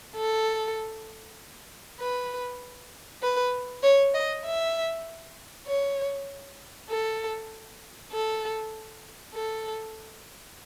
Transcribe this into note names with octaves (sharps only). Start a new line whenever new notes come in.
A4
B4
B4
C#5
D#5
E5
C#5
A4
A4
A4